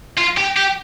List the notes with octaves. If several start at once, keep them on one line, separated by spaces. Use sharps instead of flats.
F4
G4
G4